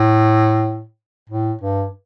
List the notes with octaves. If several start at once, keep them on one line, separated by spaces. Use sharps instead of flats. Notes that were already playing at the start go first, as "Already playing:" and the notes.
Already playing: A2
A2
G2